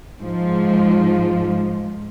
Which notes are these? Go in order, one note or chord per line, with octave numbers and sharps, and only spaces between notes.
G#2 F3